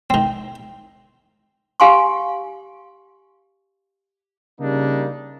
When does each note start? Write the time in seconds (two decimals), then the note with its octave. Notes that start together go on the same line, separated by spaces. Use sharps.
0.10 D#3 C4
1.80 G4 F5 G#5 C6 C#6
4.60 C#3 G3 A#3 D4 D#4